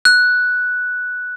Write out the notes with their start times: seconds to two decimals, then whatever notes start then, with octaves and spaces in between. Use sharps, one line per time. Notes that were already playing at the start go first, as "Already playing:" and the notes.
0.05 F#6